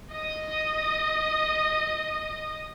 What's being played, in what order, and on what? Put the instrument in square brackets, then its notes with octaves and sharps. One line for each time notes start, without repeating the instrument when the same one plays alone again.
[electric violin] D#5 D#6